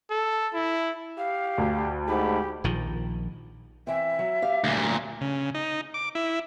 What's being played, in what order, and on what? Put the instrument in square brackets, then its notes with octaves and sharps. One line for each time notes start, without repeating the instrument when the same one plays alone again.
[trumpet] A4
E4
[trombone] G4 [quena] F5
[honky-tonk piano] D2
[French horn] G#2 [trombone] G4 [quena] B5
[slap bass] A#1 D#3 F3
[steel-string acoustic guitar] E3 C4 [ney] E5
[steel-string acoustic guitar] F#3
G4 F5
[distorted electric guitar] D2 A#2
[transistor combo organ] C#3
D#4
D6
E4